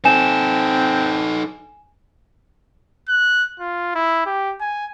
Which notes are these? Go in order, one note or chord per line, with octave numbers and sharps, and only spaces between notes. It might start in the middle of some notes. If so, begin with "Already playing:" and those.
C4 D#4 A4 G#5 E7
F#6
F4
E4
G4
G#5